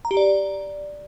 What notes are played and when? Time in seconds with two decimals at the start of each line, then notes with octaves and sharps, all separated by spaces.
0.05 A#5
0.11 G4
0.17 D5